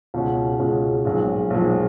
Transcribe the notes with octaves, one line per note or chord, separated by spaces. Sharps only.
C#2 B2 G#3 C#4
C#2 B2 G#3 C#4
B1 A#2 F3 G#3
B1 A#2 F3 G#3